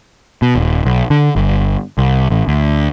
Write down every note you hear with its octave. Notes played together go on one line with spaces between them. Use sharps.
B2
D#1
B1
D3
G1
C2
A1
D2